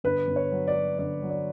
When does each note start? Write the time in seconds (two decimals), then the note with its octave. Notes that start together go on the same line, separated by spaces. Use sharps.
0.04 G1 B4
0.28 G1
0.36 C#5
0.52 F#3
0.67 D5
0.75 F#3
0.99 G1 D5
1.22 F#3
1.30 D5